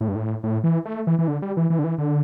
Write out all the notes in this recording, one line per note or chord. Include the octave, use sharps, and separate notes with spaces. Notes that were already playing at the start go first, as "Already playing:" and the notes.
A2
G2
A2
A2
E3
A3
E3
E3
D3
G3
E3
E3
D3
E3
D3